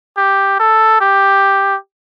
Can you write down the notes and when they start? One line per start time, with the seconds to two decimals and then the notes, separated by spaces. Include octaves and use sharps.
0.17 G4
0.59 A4
1.01 G4